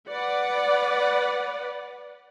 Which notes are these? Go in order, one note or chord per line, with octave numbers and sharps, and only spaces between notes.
B4 D5 F#5